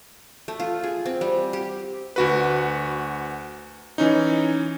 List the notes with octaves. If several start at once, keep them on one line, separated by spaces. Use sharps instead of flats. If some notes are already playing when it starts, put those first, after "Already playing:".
A3
F4
G#4
C4
G3
G4
D2 F#4 B4
E3 C#4 D#4